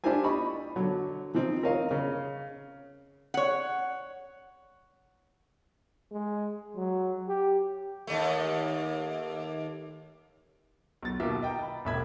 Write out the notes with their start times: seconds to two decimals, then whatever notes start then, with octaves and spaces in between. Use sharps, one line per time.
0.04 D4 E4 F4 G4 C5 G#5
0.24 D#5 B5 C#6
0.76 D3 F#3
1.34 E3 F3 C4 D#4
1.62 C4 A#4 C#5 D#5 F5
1.91 C#3
3.34 C#5 F#5
6.11 G#3
6.76 F#3
7.28 G4
8.07 D#2 A3
11.03 B1 A6
11.20 D#2 B2 A#4 E5 D6
11.42 D#5 G5 A#5
11.62 B5
11.85 E1 A1 E5 B5 G#6